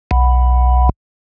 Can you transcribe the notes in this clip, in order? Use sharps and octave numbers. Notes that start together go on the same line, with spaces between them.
B1